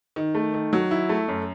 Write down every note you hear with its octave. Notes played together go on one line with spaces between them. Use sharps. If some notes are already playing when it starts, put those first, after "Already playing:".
D#3
A3
D#3
F#3
E4
A3
F#2